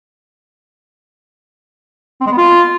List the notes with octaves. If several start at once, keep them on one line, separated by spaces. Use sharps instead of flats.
C4
G#3
B3
F4